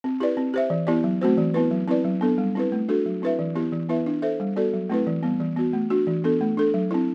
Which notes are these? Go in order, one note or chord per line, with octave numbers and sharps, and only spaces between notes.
C4
E4 G4 B4 D5
C4
G4 C5 E5
E3
B3 E4 G4 D5
F#3
A3 C4 F#4 C5
E3
B3 E4 B4
F#3
C4 E4 B4 D5
F#3
B3 D4 A4
G3
C4 E4 B4
A3
D4 F#4 A4
F#3
C4 E4 B4 E5
E3
B3 E4 G4
E3
B3 E4 B4 E5
D4
A4 C5 E5
G3
B3 F#4 A4 D5
F#3
A3 C4 E4 B4
E3
G3 B3
E3
B3 F#4
A3
D4 F#4
E3
B3 D4 A4
A3
D4 A4
F#3
C4 E4